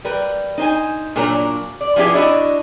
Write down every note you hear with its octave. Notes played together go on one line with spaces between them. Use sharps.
G3 A#4 B4
D#4 C5 G#5
A#2 F#3 D4 A#4 A#5
D5
F3 B3 E4 G4 G#4
D4 E4 F#4 D5 D#5